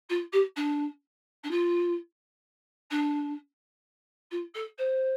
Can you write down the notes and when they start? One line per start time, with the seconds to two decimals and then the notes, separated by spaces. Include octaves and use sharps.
0.09 F4
0.32 G4
0.56 D4
1.44 D4
1.51 F4
2.91 D4
4.31 F4
4.54 A4
4.78 C5